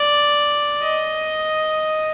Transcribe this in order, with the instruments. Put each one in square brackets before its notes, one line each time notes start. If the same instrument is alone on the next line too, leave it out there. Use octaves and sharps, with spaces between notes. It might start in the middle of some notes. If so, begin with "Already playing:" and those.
Already playing: [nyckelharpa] D5
D#5